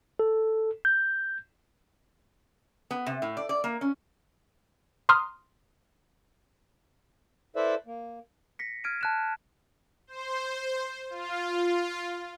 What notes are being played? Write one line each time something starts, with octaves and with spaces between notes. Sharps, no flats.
A4
G6
B3
C3
A2
D5
D5
A#3
C#4
A#5 C6 D#6 F6
E4 A4 B4 C5 D5 E5
A#3
A#6 B6 C#7
F6 G#6 D7 D#7
A5 F#6 E7
C5
F4